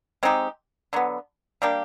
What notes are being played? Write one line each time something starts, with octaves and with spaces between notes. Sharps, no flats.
G#3 C4 D#4 G4
D3 F#3 B3
G3 A#3 D4 G4